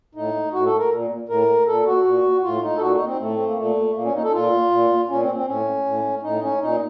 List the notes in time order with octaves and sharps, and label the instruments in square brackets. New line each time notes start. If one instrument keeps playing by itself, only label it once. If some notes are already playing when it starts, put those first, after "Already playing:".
[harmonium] A2 D#4
A2 F#4
A4
A#4
A#2
A2 A#4
A#2 A4
F#4
A#2
A2 F4
D#4
A4
A#2 F#4
D#4
C4
A2 A3
C4
A#3
A#2 A3
A#2 A#3
C#4
D#4
A4
A#2 F4
A#2
A#2 C#4
C4
C4
A2 C#4
A2
A2 D#4
C#4
A#2 D#4